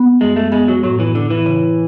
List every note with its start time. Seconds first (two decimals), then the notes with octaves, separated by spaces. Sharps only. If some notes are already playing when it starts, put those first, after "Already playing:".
Already playing: B3
0.21 F#2 G#3
0.36 A3
0.52 G#3 B3
0.68 F#3
0.84 A2 F#3
1.00 E3
1.15 D3 E4
1.30 E3
1.46 C#3